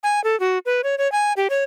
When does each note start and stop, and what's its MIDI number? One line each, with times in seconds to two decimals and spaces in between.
0.03 0.22 80
0.24 0.38 69
0.40 0.58 66
0.66 0.81 71
0.84 0.98 73
0.98 1.10 73
1.12 1.33 80
1.37 1.48 67
1.50 1.64 73